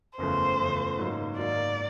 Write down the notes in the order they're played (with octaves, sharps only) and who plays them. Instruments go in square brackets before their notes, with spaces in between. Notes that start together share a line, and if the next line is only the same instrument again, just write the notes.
[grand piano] F#1 E2 C#3 F3 A3 [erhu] C5
[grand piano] F#1 E2 C#3 F3 A3
G#2 D#3 F#3 A#3
[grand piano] G#2 D#3 F#3 A#3 [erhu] D5